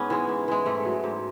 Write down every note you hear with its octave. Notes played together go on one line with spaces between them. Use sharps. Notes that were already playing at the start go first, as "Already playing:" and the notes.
Already playing: G#2 B3 C#4
E3 G#3
G#2
E3 G#3
G#2 A3
F#3
G#2